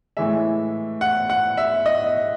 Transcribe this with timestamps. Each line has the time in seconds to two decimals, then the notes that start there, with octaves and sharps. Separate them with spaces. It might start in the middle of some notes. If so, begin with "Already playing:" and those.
0.17 A2 E3 G#3 E5
1.01 F#5
1.30 F#5
1.57 E5
1.86 D#5